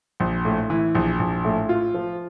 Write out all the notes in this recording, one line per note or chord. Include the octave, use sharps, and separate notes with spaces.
A#1
A2
E3
A#1
A#1
A2
F4
F3